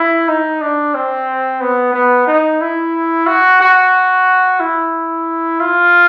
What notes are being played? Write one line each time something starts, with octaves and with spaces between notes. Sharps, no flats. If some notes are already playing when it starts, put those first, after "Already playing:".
Already playing: E4
D#4
D4
C4
B3
B3
D#4
E4
F#4
F#4
E4
F4